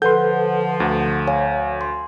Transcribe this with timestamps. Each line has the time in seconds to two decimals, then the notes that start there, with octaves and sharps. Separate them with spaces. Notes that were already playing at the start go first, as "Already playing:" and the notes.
0.02 D3 F3 A4 B4 F#5 C6 G6
0.80 D2
1.28 C#5 F5 G#5
1.81 C6